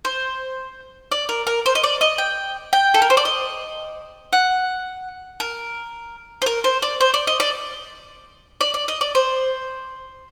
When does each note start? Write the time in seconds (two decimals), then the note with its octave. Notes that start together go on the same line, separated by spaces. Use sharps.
0.05 C5
1.12 D5
1.29 A#4
1.47 A#4
1.66 C5
1.75 D#5
1.84 D5
2.01 D#5
2.18 G5
2.73 G5
2.94 A4
3.02 A#4
3.10 C5
3.17 D5
3.25 D#5
4.33 F#5
5.40 A#4
6.42 C5
6.46 A#4
6.64 C5
6.82 D5
7.01 C5
7.14 D5
7.27 D#5
7.40 D5
8.61 D5
8.74 D5
8.88 D#5
9.01 D5
9.15 C5